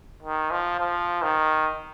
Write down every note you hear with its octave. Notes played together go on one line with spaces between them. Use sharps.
D#3
F3
F3
D#3